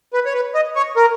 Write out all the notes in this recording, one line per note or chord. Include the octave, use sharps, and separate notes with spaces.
B4
C#5
B4
D#5
C#5
A#4